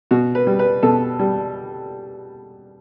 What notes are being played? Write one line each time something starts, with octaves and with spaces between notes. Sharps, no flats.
B2 F#4
B4
G3
B4
B2 A4
G3